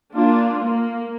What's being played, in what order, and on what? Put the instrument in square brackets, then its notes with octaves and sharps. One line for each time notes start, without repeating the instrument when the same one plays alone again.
[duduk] A#3 [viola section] D4 F4
[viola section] A#3